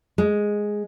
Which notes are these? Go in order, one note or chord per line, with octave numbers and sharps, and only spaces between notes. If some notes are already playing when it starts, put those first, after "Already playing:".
G#3